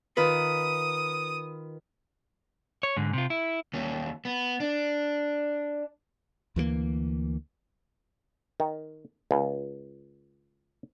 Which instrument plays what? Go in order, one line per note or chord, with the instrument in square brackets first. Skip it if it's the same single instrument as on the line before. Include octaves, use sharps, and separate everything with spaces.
[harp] D#3 F4 B4 [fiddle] D#6
[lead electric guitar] C#5
G#2 D3
C3 F4
E4
[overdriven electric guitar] D#2 C#4
B3
D4
[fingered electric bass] D2 E3 F3 A#3
[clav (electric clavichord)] D#3
C#2